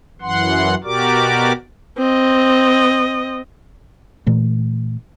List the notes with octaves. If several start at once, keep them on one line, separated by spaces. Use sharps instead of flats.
F#2 E3 F#5 C6
B2 F#4 G4 A#4 D5 D6
C4 D#5
A#2 E3 A3